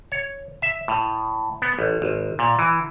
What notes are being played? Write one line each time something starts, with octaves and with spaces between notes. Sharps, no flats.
C#5
E5
A2
B3
A1
G#1
A#2
E3